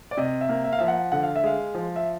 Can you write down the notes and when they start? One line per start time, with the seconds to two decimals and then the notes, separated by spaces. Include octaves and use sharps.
0.11 D5
0.17 C3 D#5
0.41 E5
0.49 A#3
0.64 E5
0.73 F5
0.79 F3 E5
0.88 F#5
1.12 D3 F#5
1.23 F5
1.36 E5
1.44 G#3 F5
1.75 F3
1.96 E5